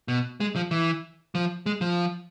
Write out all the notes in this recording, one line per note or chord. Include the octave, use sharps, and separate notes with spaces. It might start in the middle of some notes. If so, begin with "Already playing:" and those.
B2
G#3
F3
E3
F3
G#3
F3